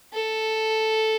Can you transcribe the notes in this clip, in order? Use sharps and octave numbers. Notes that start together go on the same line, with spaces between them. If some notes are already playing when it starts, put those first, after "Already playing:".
A4